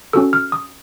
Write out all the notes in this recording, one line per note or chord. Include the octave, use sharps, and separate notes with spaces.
C#4 F#4 A4 E6
F6
D#6